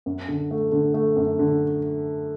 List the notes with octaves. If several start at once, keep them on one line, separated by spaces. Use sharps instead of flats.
F#2
D3
A3
D3
A3
F#2
D3